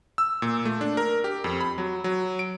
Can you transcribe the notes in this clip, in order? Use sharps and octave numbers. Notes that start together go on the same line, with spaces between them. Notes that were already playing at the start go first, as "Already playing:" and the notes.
E6
A#2
A3
D4
A#4
G4
F2
B5
F#3
F#3
D7